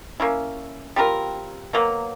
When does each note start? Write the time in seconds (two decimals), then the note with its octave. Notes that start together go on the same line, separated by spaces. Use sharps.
0.20 A#3 C#4 E4
0.96 G3 C4 F4 A#4
1.73 B2 F#3 A#3